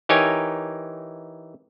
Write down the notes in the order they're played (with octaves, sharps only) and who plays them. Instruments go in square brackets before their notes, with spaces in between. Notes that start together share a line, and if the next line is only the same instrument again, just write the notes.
[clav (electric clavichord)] E3 D#4 G4 A#4 C#5 G#5